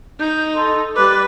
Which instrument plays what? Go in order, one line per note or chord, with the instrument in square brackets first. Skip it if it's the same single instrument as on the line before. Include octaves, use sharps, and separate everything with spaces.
[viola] D#4 [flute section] G6
[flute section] A4 D#5 C6
[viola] G3 B4 [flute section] D5 D6 F#6